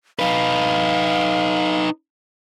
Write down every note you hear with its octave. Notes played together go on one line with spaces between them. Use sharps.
D#4 B4 F5